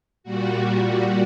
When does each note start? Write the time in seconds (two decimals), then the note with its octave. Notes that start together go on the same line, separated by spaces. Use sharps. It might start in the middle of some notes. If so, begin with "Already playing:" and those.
0.24 A#2 G3 F#4